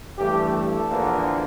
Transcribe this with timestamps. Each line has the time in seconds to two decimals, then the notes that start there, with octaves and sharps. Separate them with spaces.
0.17 G2 E3 A3 G4
0.53 A4
0.88 E2 D3 F3 A#3